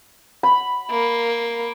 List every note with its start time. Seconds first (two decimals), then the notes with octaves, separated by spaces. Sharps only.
0.43 B5
0.91 A#3